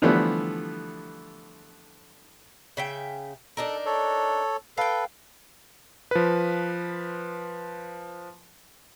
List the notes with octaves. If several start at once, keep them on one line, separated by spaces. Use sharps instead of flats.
D3 E3 F3 G3 A3 B3
C#3 E5 G5
D4 D#4 A4 A#4
A4 C#5
A4 B4 F5 G5
F3 B4